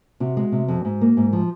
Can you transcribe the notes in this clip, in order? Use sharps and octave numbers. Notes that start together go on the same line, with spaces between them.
C3 F#4
G#3
C3
F2
G#2
A#3
G#2
F3